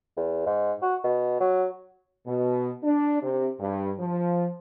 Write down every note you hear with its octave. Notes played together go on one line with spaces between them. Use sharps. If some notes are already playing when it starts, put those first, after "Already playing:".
E2
G#2
F#4
B2
F#3
B2
D4
C3
G2
F3